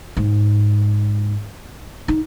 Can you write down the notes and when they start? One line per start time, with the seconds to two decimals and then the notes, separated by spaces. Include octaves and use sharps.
0.17 G#2
2.08 D#4